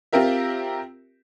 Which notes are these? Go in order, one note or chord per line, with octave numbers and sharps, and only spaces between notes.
C4 F4 G4 A#4 E5